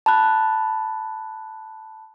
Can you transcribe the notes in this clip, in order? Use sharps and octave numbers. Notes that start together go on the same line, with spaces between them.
A5 B5 F#6